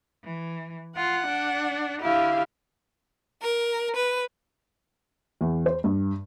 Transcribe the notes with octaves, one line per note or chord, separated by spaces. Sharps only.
E3
F4 F#5
D4
D3 E4 G4 F5
A#4
B4
E2
C5
G2